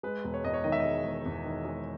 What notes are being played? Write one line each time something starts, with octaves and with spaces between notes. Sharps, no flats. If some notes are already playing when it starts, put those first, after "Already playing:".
G#3 B4
E1
C#5
E2 D#5
C#5
D#3 D#5
E5
D#5
G#3
E1
E2
D#3
G#3